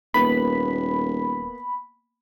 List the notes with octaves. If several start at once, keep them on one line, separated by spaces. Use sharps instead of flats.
D#1 A#3 B3 B5